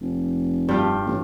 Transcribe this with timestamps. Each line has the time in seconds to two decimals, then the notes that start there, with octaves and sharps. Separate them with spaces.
0.01 F1
0.68 G2 F4 G4
1.06 A1